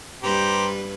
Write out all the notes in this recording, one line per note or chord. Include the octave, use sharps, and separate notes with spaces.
G2 G3 G4 B4 C5 A#5